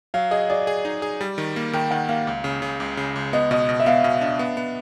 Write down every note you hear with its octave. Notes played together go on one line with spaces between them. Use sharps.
F#3 F5
G#4 D#5
G#4 D5
G#4
D#4
G#4
G3
D#3
A#3
D#3 G5
D#3 F#5
A#3 F5
C#2
C#3
C#3
C#2
C#3
C#2
B3 D#5
B2 D#5
B2
E5
B3 F5
B2
D4
B3
B3